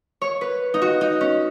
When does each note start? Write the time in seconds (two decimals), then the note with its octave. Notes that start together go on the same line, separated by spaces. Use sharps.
0.21 C#5
0.41 B4
0.74 D#4
0.82 F#4
1.01 D#4
1.21 C#4